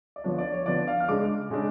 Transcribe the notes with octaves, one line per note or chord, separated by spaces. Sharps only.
D5
D3 F3 B3 D4 C#5
D5
C#5
D3 F3 B3 D4 D5
F5
F6
C#3 G#3 D4 D6
C#3 G#3 D4